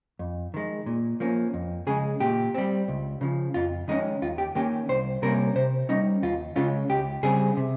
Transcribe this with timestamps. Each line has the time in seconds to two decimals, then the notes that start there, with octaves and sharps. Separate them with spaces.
0.19 F2
0.54 D#3 G#3
0.86 A#2
1.20 F3 A#3 C#4
1.54 F2
1.87 C#3 G#3 G#4
2.20 A#2 G4
2.54 G3 C4
2.88 C#2
3.21 C#3 F3
3.54 F2 F4
3.88 D#3 G#3 C#4 D#4
4.22 D#2 F4
4.38 G4
4.55 D#3 A#3 C#4 G4
4.89 C2 C5
5.22 C3 G3 A#3 C#4 A#4
5.55 C3 C5
5.89 G3 C#4 D#4
6.22 D#2 F4
6.56 C#3 G#3 C#4 F4
6.90 C#2 G4
7.23 C#3 G3 C4 G#4
7.57 C3